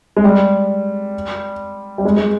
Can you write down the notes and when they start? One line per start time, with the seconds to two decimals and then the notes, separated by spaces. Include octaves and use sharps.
0.17 G#3
0.24 G3
1.98 G3
2.05 G#3
2.17 G#3